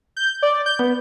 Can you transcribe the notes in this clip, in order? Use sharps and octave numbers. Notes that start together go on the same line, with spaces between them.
G6
D5
G6
B3